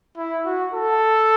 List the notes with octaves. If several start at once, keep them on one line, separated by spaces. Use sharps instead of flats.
E4
F#4
A4